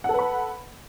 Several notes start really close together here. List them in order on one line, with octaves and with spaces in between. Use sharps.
F#5 A4 B4 B5